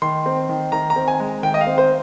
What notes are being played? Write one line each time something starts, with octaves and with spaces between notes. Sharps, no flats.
D#3 C6
C4
D#3
D#3 A#5
A#5
C4
G#5
G#3
D#3 G5
D#5
F5
C4
C5